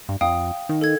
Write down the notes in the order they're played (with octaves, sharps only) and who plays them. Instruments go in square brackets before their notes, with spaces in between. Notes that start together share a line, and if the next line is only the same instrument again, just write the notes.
[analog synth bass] G2
[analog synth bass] F2 [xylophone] F5 G5 D#6
[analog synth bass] D#3
[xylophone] A4 G#6